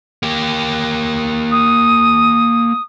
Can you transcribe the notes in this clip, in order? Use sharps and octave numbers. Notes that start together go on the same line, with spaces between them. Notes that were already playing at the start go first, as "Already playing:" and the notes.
A#3 G4
D#6